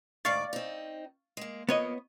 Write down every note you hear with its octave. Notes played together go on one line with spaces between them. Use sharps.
D2 G#2 D5 F5 C#6 A6
C4 D#4
G#3 A#3
F2 A#3 B3 C#5 D#5